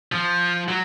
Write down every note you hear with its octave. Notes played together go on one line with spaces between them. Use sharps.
F3
F#3